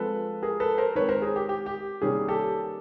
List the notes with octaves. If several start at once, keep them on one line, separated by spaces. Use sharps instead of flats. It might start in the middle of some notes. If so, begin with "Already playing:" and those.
Already playing: F3 G#3 C4 A4 B4
G#4 A#4
A4 B4
A#4 C5
D#3 G#3 C4 B4 C#5
A#4 C5
G#4
G4
G4
G4
C3 D#3 G3 A#3 C#4 G#4
G4 A4